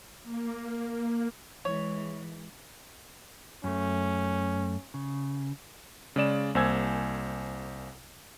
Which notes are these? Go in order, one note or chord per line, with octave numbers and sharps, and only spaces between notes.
A#3
E3 G#3 C#5
F#2 A3 C#4
C#3
C#3 G#3 D5 E7
C2 A#3 C5 G#5 E6 G#6